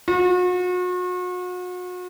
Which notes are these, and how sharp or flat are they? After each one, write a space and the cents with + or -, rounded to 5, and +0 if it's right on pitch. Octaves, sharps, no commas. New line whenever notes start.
F#4 -40